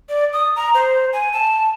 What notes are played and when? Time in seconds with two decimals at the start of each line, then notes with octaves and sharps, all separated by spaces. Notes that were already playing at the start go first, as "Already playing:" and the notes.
0.09 D5
0.33 D#6
0.56 A#5
0.74 C5
1.13 G#5
1.33 A5